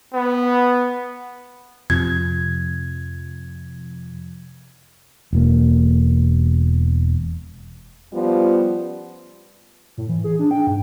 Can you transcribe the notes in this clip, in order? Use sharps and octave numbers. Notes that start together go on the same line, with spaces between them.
B3
F2 C3 F3 G#6
E1 A#3
F3 G3 B3 C#4 F4
A2
E3
G#4
D4
G5
G#2